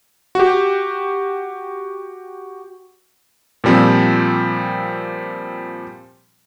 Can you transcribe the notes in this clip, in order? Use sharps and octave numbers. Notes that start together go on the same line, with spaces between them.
F#4 G4
A#2 F3 G3 C4